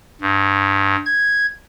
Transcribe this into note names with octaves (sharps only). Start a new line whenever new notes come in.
G2
G#6